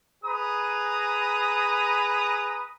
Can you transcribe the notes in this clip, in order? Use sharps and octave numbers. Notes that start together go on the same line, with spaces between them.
G#4 B4 A#5 D#6